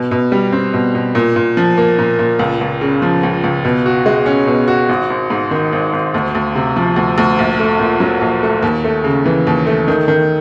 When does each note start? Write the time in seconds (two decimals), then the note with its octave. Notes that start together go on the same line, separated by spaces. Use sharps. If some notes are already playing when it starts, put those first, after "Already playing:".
Already playing: B2
0.11 B2
0.32 G3
0.52 C4
0.74 B2
0.95 B2
1.15 A#2
1.36 A#2
1.57 F3
1.78 A#3
1.98 A#2
2.19 A#2
2.39 C#2
2.61 C#2
2.81 C#3
3.02 F3
3.23 C#2
3.44 C#2
3.65 B2
3.86 F#4
4.06 G#3
4.26 C#4
4.47 B2
4.68 F#4
4.89 G#1
5.10 G#1
5.30 G#2
5.51 D#3
5.73 G#1
5.93 G#1
6.14 D2
6.35 D2
6.55 C3
6.76 F3
6.96 D2
7.18 D2
7.39 A#1
7.59 A3
7.80 A#2
8.00 F#3
8.21 A#1
8.43 A3
8.63 D#2
8.84 A3
9.04 C#3
9.26 E3
9.47 D#2
9.67 A3
9.88 D#3
10.08 D#3